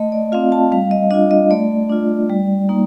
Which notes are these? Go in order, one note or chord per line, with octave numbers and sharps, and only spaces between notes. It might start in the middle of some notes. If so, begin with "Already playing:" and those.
Already playing: A3 D#5
D5
C4 F4 F5
A5
G3 F5
D#5
D4 F4 D#5
D#5
A3 D5
D4 F4
G3
A#3 D#4